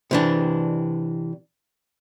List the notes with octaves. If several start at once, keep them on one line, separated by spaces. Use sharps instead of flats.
C3 E3 D4